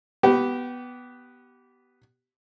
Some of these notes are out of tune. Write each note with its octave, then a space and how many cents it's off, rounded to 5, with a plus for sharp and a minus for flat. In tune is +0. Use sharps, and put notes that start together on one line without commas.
B3 +0 G4 -25